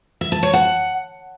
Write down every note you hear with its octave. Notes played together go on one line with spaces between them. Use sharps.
E5
A5
C#5
F#5